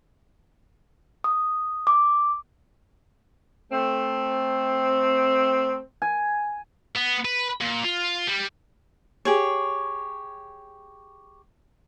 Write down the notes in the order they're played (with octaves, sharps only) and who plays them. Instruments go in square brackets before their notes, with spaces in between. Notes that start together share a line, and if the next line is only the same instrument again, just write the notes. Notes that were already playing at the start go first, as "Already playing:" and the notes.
[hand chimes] D#6
D6
[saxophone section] A3 C4
[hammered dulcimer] G#5
[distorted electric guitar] B3
B4
A#2
F4
G3
[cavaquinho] G4 G#4 C#5